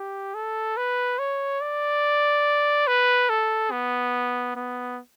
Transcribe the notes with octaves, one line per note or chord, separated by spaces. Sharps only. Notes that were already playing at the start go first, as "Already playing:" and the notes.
Already playing: G4
A4
B4
C#5
D5
B4
A4
B3
B3